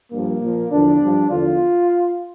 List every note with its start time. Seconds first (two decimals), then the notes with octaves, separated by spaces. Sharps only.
0.11 G2 F3 A#3
0.41 A#2 F3
0.71 E2 D3 F3 D4
1.01 G2 F3
1.30 E2 D3 F3 F4